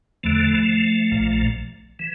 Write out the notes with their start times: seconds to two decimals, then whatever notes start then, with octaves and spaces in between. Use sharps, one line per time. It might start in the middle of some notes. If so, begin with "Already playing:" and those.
0.23 E2 D3 F3 A3
1.12 A#1 A#2
1.99 E3